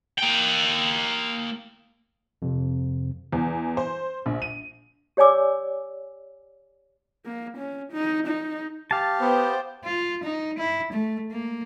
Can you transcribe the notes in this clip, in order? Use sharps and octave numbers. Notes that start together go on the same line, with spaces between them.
A#3 G5
F2 C3
E2
C5
A#1
D#7
G4 C#5 D5 G#5 D6 E6
A#3
C#4
D#4
D#4
G4 F5 A5
B3 C5 G5
F4
D#4
E4
A3
A#3